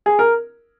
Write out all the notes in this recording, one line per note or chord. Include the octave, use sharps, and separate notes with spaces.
G#4
A#4